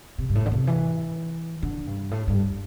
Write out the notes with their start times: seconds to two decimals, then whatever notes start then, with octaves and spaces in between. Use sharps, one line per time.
0.18 C3
0.30 G2
0.35 A2
0.46 D3
0.52 C3
0.67 E3
1.63 D3
1.87 G2
2.11 A2
2.28 G2